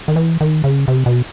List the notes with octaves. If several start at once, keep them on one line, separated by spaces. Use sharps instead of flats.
D#3
E3
D#3
C#3
C3
B2